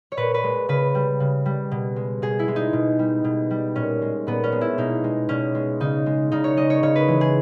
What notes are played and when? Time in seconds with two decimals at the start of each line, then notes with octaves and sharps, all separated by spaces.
0.12 C#5
0.17 A#2 B4
0.34 B4
0.43 G#3
0.69 C#3 B4
0.95 G3
1.20 C#3
1.46 G3
1.71 B2
1.96 G#3
2.22 B2 G#4
2.39 E4
2.48 G#3
2.56 D#4
2.73 B2
2.99 G3
3.24 B2
3.51 G3
3.75 A#2 C#4
4.02 G#3
4.27 A#2 B3
4.44 C#4
4.52 G#3
4.61 E4
4.78 B2 D#4
5.04 G#3
5.29 B2 C#4
5.55 G#3
5.80 C#3 D#4
6.06 G#3
6.32 C#3 D#4
6.44 C#5
6.57 G#3 D#5
6.70 C#5
6.83 C#3 C#5
6.96 B4
7.08 E3 G#3
7.21 G#4